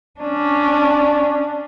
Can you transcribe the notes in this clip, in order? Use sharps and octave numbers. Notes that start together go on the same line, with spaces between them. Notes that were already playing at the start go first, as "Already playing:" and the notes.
C#4 D4